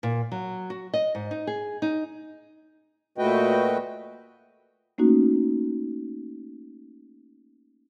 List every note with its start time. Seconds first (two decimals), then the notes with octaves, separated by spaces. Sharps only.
0.03 A#2
0.32 F#3
0.70 F#4
0.94 D#5
1.15 G#2
1.31 D#4
1.47 G#4
1.82 D#4
3.18 A#2 A3 F#4 B4 D#5 G5
4.98 A3 A#3 C#4 D#4 F#4